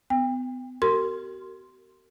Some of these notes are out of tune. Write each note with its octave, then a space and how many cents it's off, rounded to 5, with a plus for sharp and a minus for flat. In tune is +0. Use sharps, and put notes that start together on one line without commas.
B3 +35 G5 +35
F#4 +45 A#4 -30 C6 +0